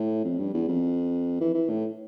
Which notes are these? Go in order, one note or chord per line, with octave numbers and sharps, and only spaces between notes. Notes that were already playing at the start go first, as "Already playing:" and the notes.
Already playing: A2
F2
G2
E2
F2
E3
E3
A2